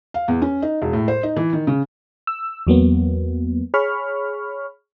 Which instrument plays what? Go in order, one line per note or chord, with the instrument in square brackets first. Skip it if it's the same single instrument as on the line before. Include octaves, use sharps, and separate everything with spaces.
[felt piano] F5
E2
C#4
D#4
E1
A2
C5
D#4
E3
D#3
C#3
[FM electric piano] E6
E2 F#3 A#3 B3
G#4 C#5 B5 C#6 F6